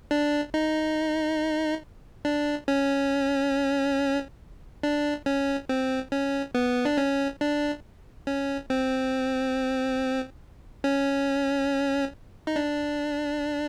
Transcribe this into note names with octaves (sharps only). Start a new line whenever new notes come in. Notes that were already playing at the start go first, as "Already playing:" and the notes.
D4
D#4
D4
C#4
D4
C#4
C4
C#4
B3
D4
C#4
D4
C#4
C4
C#4
D#4
D4